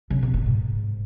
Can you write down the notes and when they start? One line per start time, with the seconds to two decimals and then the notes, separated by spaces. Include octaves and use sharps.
0.10 C#3
0.23 B2
0.34 A#2
0.46 G#2